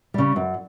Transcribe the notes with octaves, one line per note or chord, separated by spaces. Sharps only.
C#3 G3
F#2